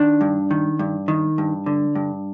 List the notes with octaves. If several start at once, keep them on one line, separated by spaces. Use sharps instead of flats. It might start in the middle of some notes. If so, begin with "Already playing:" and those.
Already playing: D#3 D4
G2
D#3
G2
D#3
G2
D3
G2